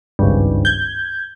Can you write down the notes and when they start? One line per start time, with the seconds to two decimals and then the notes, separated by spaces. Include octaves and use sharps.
0.19 G#1 C#2 G2
0.65 G6 G#6